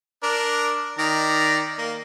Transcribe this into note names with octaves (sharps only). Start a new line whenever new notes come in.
D4 A#4
D#3 D5 A#5
A#3